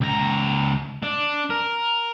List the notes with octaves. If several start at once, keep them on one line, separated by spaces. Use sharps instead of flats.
C#2 A#5
D4
A#4